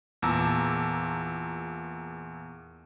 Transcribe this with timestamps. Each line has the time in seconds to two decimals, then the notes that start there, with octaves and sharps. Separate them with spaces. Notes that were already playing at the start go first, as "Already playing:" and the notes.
0.22 E2 A#2 A5 A#5 D6 E6